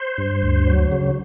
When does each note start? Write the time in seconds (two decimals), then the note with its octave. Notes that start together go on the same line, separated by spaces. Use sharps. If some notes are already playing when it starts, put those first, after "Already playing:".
Already playing: C5
0.18 G2
0.43 D2
0.67 F#3
0.92 C#3